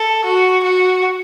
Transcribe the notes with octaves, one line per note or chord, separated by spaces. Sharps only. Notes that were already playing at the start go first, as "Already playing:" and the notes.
Already playing: A4
F#4
F#4